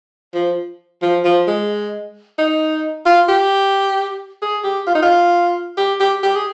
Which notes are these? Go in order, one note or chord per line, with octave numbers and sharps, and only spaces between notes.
F3
F3
F3
G#3
D#4
F4
G4
G#4
G4
F4
D#4
F4
G4
G4
G4
G#4